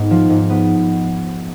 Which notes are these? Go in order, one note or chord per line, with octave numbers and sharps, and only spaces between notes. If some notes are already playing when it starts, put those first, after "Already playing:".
Already playing: G#2 B3
F3
G#2
B3